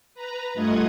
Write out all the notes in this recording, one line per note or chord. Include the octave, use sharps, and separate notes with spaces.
B4 A#5
G2 A3 F4 D#5 F#5 G#6